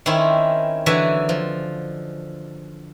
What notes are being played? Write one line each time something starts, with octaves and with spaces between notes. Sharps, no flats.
D#3 C4 C#4 E4
D3 E3 F#3 F#4 E5 G#5
F3